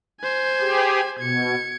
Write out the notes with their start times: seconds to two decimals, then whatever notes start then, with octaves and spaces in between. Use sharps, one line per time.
0.20 C5 G#5
0.60 G4 G#4
1.19 B2 G#6 C#7